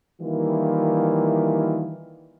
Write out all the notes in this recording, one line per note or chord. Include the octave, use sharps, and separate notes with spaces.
D#3 E3 G3 A#3 E4 F4